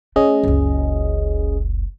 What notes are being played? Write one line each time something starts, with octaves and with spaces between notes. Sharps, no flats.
A3 C#4 G#4 D#5
F#1 C#2